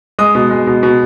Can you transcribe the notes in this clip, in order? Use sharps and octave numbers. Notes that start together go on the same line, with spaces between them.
G#3 D#6
B2
G#3
B2
B2